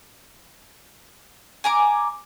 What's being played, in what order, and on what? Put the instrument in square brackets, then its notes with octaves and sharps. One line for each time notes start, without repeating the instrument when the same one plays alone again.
[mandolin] G#5 A#5 D6